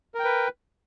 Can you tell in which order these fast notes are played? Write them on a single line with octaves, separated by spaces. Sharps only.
A#4 G5 B4